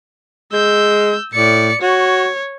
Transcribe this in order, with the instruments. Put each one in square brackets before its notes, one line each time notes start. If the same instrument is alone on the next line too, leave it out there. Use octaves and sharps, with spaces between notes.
[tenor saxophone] G#3 [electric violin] E6 G6
[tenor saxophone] A2 [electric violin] D5 C#7
[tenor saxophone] F#4 [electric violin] C#5